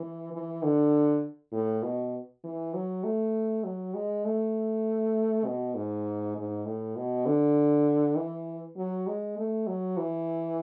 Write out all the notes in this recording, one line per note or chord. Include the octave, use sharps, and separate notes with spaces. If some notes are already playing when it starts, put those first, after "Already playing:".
Already playing: E3
E3
D3
A2
B2
E3
F#3
A3
F#3
G#3
A3
B2
G#2
G#2
A2
B2
D3
E3
F#3
G#3
A3
F#3
E3